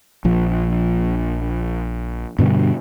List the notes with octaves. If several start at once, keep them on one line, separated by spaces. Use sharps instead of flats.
A#1 F3
G2 B2 D3 G3